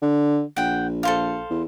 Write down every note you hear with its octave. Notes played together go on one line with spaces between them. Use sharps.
D3
A#1 F#5 G5
A4 C5 F5
E2